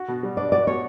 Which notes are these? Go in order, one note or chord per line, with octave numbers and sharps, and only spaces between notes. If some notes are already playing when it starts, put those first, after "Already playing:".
Already playing: F#4
B2
G3
D4 D5
F#4 D5
B2 C#5